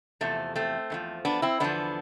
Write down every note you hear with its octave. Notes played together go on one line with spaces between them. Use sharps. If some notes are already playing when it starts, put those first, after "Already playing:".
E2 C3 F3 A3
A3 C4
E2 D3 F3
B3 D4
C4 E4
E2 D3 F3 B3 D4